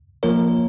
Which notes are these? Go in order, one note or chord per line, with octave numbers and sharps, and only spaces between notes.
F3 A#3 F4 A#4 C#5